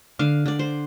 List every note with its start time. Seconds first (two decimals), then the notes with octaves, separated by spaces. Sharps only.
0.19 D3 F5
0.46 D3 D5
0.59 C5